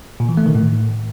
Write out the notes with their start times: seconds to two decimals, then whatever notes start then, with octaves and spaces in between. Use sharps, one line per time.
0.20 A#2
0.29 E3
0.37 A3
0.46 D#3
0.55 A2